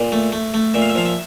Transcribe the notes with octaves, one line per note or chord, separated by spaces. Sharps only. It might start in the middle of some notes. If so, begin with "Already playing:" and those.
Already playing: A#2
A3
A3
A3
A#2 E5
F5
E5
F3 F5
E5